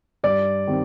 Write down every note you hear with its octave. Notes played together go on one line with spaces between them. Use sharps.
G2 D5
D#3 G3 C4